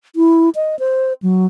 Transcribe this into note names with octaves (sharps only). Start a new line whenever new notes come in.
E4
D#5
C5
F#3